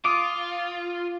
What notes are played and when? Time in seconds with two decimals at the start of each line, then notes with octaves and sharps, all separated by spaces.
0.05 F4 D6 D#6